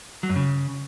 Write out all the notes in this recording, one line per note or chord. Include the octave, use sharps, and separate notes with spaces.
F#3
F#2
C#3